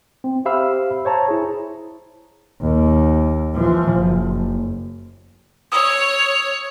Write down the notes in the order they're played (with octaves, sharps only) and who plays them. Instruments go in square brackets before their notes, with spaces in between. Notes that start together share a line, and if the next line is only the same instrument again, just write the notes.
[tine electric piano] C4
G4 C5 E5 F5 B5 E6
C5 C#5 A5 A#5
E4 G#4
[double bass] D#2
E3 F3
F#1
[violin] C#5 [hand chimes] D#6 E6